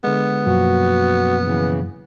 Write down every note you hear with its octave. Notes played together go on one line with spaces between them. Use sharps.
D3 G#3 B3
F#2 B2 F3 A#3 F#4
C#3 E3